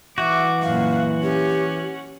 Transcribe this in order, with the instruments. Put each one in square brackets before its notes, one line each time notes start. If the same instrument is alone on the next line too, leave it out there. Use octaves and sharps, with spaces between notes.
[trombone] E3 [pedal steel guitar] F#4 F#5 [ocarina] E5 [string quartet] D6
[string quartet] F#2 A#2 [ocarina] F5
[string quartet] C#4 [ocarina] G4